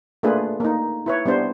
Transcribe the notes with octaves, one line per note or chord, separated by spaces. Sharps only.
A3 A#3 D4 F4 G#4 B4
A#3 D#4
E4 B4 C#5
G3 B3 D4 C5